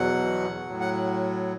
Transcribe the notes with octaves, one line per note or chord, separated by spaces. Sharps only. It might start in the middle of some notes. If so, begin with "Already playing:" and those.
Already playing: E2 B2 F#3 F#5
A2 F#3
F#5